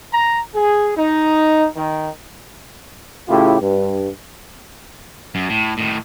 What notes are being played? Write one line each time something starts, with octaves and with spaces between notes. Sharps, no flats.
A#5
G#4
D#4
D#3
A2 C#3 E4 F4 G4
G2
F#2
A2
A2 D#3